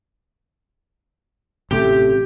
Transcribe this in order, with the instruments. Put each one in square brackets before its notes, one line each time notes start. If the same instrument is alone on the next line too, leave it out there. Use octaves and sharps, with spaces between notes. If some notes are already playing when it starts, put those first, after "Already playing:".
[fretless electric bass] A1 C3 A3 [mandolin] G4